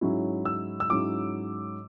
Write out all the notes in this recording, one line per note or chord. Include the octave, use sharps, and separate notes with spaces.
G#2 F#3 C#4 E4
E6
E6
G#2 F#3 C#4 E4 D6